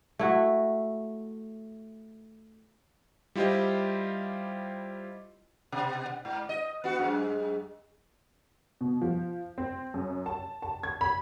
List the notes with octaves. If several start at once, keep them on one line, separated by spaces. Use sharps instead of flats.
A3 E4 F#4
G3 E4 F4 G4 C5 D#5
B2
G#2
D#5
B3 F#4
F#2 G#3
B2
F3
C4
F#2
A5
A5
G#6
B5